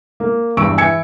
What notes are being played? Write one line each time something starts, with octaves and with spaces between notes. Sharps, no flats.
A#3
E2 G2 C#6 E6 D7
E3 G#5 E6 G#6 C#7